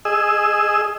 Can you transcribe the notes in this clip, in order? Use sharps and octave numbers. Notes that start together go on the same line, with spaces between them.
G#4 D#5 E6